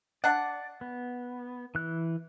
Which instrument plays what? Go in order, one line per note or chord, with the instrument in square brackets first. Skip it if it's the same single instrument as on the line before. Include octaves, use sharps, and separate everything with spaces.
[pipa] D4 F#5 [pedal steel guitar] D5
[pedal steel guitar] B3
E3 F#6